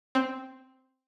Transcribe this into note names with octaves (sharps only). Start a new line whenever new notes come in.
C4